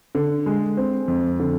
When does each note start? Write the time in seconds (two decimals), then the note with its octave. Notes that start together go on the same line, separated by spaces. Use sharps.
0.15 D3
0.46 G#3
0.77 C4
1.08 F2
1.40 D3